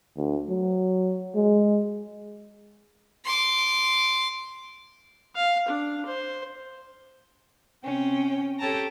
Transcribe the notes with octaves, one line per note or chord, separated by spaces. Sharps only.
D2
F#3
G#3
C6 D6
F5
D4
C5
C3 C#4 G5
G4 A4 C#5 G5 A5 A#5